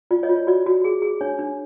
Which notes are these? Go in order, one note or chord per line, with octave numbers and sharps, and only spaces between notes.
F4 D5
C#5 D#5
F4
C#5
F#4 D5
F#4
G#4
G#4
D4 C#5
D4